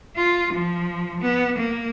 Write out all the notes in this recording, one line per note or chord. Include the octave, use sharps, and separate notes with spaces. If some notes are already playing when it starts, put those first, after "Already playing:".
F4
F3
B3
A#3